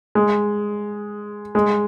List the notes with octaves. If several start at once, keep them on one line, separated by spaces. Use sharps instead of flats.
G#3
G#3